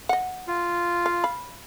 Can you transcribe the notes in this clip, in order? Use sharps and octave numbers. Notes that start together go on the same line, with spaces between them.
D#5 F#5
F4
F5
F5 B5